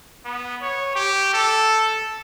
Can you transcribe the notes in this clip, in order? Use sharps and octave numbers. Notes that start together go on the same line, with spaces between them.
B3
C#5
G4
A4